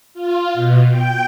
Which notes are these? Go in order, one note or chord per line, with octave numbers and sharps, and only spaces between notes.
F4
B2
G5